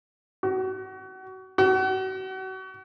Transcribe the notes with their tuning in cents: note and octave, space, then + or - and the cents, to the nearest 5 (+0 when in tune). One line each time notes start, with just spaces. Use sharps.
F#4 +30
F#4 +35